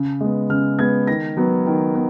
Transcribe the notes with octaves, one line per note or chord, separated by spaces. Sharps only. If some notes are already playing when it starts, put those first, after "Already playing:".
Already playing: C#3
G#3 B3
C#3 F6
G#3 B3 G#6
D#3 A#6
F#3 B3
D#3
B3